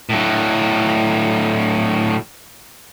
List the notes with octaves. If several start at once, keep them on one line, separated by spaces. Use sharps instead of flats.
A2 F#3